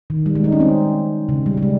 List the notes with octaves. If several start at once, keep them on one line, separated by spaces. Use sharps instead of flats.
D#3
G3
G#3
D#4
C#4
C4
C#3
G3
G3
G#3